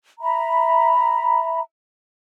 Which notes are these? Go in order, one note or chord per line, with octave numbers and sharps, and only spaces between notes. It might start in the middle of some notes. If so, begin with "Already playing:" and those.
E5 A#5 B5